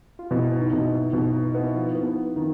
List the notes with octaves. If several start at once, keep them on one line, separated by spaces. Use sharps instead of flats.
F4
B2 E4
D#4
B2
E4
B2 D#4
D#4
B3 E4
F3 F4
B3
D#3